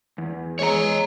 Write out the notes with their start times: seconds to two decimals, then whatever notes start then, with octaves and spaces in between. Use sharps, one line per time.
0.18 E2
0.59 G#3 C#5 A#5